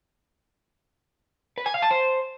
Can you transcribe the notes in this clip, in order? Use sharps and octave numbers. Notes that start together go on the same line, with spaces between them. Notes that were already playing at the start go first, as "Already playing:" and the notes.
B4
G#5
F5
A5
C5